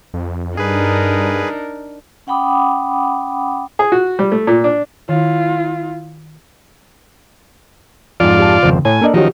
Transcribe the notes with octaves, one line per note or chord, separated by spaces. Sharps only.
F2
G2 D4 D#4 G#4 A#4 B4
C#4 F#5 G5 B5 D6 D#6
G#4
F#4
G3
A3
A#2
D4
D#3 E4 F4
F2 G#2 F4 D5
G4 A5
G#1 F2 C#3 C5
A2 C#5 G#5
A#3 D4 A4 A#4 D5 D#5
D#3 F3 F#3 C#4 F#4 G4